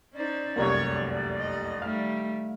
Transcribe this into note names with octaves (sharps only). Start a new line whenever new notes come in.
C#4 D#4 C5 D5
F1 C2 F#2 A#3 C#5
F#3
D#5
D#3 G3 A3 F5 F6